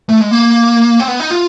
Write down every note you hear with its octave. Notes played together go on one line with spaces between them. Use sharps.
A3
G#3
A#3
C4
B3
D#4
F4